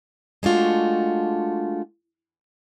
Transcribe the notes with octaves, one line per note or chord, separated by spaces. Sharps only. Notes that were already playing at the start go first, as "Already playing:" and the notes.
G#3 A3 D4 F4 F#4